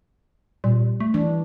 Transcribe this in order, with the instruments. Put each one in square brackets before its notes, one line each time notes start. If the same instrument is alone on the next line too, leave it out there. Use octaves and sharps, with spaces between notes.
[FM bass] A#2 [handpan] G3
[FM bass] A3
[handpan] E3 D4